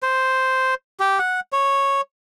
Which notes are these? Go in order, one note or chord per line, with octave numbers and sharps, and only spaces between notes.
C5
G4
F#5
C#5